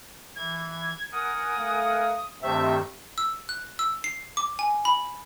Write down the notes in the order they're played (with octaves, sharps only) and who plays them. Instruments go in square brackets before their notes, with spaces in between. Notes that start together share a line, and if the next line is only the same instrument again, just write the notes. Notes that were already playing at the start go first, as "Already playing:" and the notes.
[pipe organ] E3 [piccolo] G#6
[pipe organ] A#4 F#5 G#5 [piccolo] D#6
[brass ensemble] A3 F5
[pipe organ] G2 D#3 A3 [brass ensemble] C3 [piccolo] E5
[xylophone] E6
F#6
E6
C7
D6
G#5
B5